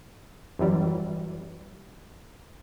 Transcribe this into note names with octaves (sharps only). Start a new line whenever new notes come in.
F#2 E3 F#3 G3